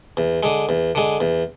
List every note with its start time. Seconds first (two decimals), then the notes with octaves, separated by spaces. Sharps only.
0.17 E2
0.43 D3 G#3
0.69 E2
0.95 D3 G#3
1.20 E2